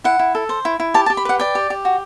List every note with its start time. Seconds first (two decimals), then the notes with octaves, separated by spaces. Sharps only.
0.04 E4 F#5
0.19 E4
0.35 A4
0.49 C5
0.65 E4
0.80 E4
0.94 G4 A5
1.06 A5
1.10 G4
1.17 B5
1.25 B4 F#5
1.39 D5 G5
1.55 G4
1.70 G4
1.85 F#4